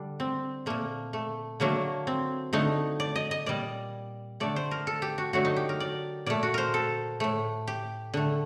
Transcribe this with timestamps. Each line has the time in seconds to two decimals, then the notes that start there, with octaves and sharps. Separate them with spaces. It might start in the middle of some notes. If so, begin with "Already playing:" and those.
Already playing: D3 G3 D4
0.20 C4
0.66 A#2 A3 A#3
1.13 A3
1.60 D3 F#3 A3 A#3
2.07 C4
2.53 D3 A3 D#4
3.00 D5
3.16 D#5
3.31 D#5
3.46 A#2 G3 D5
4.40 D3 A3 D5
4.56 C5
4.71 A#4
4.87 A4
5.02 G4
5.18 F#4
5.33 D3 F#3 A3 F#4
5.45 D#4
5.56 G4
5.69 A#4
5.80 D5
6.26 A#2 A3 D5
6.43 F#4
6.54 A#4 C5
6.74 A4
7.20 A2 A3
7.67 G4
8.14 D3 A3